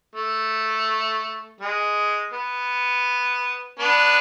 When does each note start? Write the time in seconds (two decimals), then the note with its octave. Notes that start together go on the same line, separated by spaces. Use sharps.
0.16 A3
1.61 G#3
2.34 B3
3.80 B3 D4